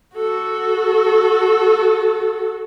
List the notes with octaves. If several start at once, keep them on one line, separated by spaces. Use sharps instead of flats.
F#4 A4